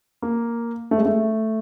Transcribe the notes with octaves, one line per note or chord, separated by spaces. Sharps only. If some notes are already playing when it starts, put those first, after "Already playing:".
A#3
A3
G#3
A3